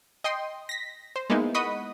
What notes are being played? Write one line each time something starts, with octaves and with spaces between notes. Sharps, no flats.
D#5 G5 C6
A#6 B6
C5
G#3 A#3 B3 D#4 E4
D#5 F#5 B5 C#6 D#6 B6